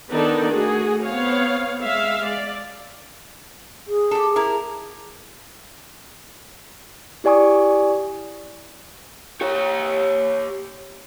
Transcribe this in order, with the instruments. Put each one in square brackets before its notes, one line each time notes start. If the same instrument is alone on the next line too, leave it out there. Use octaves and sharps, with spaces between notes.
[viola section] D#3 B3 D4 D#4 A4 D5
A3 F#4 G#4
B3 C4 C#5 F5
G#3 E5 F5
D5
[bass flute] G#4
[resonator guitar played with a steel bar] G4 A4
E4 A#4
[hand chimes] E4 G4 D5 G#5 C#6 D#6
[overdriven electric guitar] G4 C#5